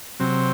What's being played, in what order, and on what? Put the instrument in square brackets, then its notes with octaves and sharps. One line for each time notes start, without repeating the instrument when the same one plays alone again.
[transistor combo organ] C3 F#3 C4